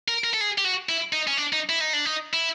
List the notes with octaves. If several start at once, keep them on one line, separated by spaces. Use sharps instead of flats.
A#4
A#4
A4
G#4
G4
F#4
E4
D#4
C#4
D4
D#4
E4
D#4
D4
D#4
E4